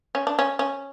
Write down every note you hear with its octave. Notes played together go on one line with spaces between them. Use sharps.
C#4
D4
C#4
C#4